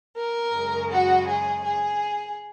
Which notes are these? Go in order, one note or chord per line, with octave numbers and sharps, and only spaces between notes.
A#4
F#2 C#3 G#3
F#4
G#4
G#4